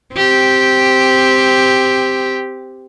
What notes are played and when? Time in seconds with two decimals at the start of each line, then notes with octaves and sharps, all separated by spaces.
0.15 C4 G4